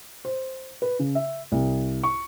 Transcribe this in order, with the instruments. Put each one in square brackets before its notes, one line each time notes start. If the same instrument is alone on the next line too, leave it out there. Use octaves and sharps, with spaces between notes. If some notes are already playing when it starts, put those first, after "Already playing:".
[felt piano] C5
B4
C#3
E5
C2
C#6